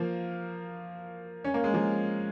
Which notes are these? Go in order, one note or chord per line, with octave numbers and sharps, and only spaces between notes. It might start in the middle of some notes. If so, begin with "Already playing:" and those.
Already playing: F3 A#3
C#4
A#3
G#3
F3 A#3